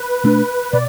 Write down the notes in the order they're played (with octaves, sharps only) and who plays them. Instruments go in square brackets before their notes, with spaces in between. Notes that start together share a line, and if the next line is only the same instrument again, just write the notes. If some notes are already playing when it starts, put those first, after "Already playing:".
Already playing: [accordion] B4
[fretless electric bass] B2 A3 D4
[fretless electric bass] B2 [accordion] D5